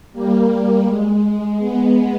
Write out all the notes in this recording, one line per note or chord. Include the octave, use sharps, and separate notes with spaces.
G3 A#3
G3 A#3
G#3
G#3 B3